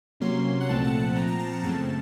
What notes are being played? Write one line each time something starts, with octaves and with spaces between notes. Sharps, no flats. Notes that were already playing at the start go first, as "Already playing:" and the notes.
C3 F#3 A#3 C#4 C6
F#5
C2 A#2 F3 A3 C4 A5
F#5
A5
A#2 F3 C4 A#5
A#5
A5
F#5
F#2 C#3 A3 C4 A5